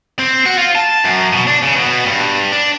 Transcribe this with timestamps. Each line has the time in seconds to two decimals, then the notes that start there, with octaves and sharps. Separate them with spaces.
0.19 C4
0.46 F#4
0.57 F4
0.75 A5
1.05 F#2
1.33 B2
1.47 D4
1.63 C#3
1.76 B2
2.07 G2
2.52 D4